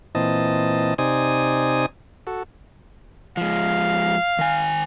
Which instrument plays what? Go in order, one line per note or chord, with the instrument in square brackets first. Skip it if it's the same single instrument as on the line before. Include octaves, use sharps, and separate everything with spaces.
[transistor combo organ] A#2 E3 C4 D#5 A5
C3 D#4 C5 D5 G#5 D#6
F#4 A4
[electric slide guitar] F3 G#3 [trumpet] F5
[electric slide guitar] D#3 G#5